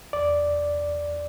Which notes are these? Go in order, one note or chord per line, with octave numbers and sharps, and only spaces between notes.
E2 D5